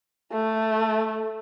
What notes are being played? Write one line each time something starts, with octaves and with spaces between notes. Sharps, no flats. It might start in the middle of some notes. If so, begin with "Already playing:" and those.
A3